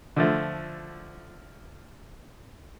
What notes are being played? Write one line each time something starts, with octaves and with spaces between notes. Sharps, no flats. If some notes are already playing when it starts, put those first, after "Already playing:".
D3 F3 A3